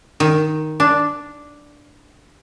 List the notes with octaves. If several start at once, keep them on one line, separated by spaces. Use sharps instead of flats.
D#3
D4